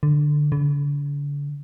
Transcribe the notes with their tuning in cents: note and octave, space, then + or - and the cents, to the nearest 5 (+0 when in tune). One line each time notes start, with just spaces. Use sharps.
D3 +10
D3 -40